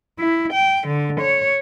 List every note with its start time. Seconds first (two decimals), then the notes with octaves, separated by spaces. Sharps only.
0.19 E4
0.53 G5
0.87 D3
1.20 C#5